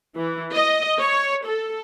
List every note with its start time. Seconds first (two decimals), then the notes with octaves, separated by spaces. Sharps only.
0.17 E3
0.54 D#5
0.99 C#5
1.46 A4